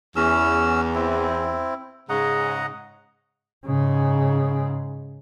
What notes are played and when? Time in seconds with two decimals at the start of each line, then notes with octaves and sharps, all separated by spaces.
0.16 E2 C#4 E6
0.95 C4 E4
2.09 G#2 C#3 D#5 F#5 A#5
3.66 G#2 C#3